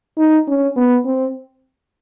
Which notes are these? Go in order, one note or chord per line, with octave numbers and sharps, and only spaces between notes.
D#4
C#4
B3
C4